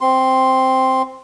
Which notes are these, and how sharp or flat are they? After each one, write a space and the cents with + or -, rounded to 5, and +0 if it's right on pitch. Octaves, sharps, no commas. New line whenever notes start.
C4 +0 C6 +0